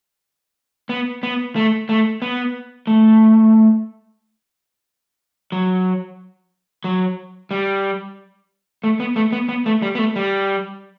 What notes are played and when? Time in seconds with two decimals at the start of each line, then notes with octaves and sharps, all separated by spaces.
0.89 B3
1.23 B3
1.56 A3
1.89 A3
2.22 B3
2.87 A3
5.52 F#3
6.84 F#3
7.51 G3
8.84 A3
9.00 B3
9.16 A3
9.32 B3
9.49 B3
9.66 A3
9.82 G3
9.95 B3
9.98 A3
10.16 G3